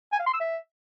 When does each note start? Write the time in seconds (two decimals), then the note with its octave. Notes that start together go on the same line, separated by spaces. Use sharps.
0.12 G#5
0.19 F5
0.26 C6
0.33 E6
0.40 E5